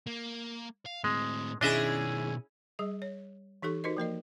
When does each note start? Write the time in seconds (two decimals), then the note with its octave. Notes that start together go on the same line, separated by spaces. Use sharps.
0.07 A#3
0.86 F5
1.04 A2 G#3 C4
1.61 B2 D#3 C#4 D4 E4 G#4 D#5 E5
2.79 G3 G#4 D#5
3.02 C#5
3.62 E3 D#4 G4 A4 C#6
3.84 D#4 F#4 A#4 C5 D#5
3.97 F3 A#3 A#4 D#5